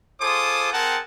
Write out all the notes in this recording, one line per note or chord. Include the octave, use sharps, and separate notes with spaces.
F4 G#4 A4 C5 D6 D#6
C4 G#4 A#4 F#5 G5 A5